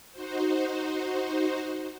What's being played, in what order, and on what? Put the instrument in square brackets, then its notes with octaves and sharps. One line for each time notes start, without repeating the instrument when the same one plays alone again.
[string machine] D#4 F#4 C5